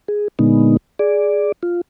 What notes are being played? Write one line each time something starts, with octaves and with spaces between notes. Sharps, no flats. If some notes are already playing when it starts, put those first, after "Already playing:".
G#4
A#2 D3 G#3 B3 D#4
G#4 D5
F4